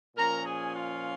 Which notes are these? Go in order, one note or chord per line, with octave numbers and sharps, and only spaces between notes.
A#2 F3 C#4 A#4 A#5
G#4 G#5
F4 F5